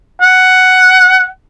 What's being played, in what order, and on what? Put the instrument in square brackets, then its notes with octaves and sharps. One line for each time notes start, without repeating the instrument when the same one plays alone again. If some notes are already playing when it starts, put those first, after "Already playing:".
[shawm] F#5